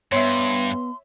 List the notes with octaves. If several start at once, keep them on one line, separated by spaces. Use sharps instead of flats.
G2 B3 C#5 E5 C6